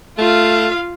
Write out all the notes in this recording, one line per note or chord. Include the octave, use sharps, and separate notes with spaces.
A3 F4 F5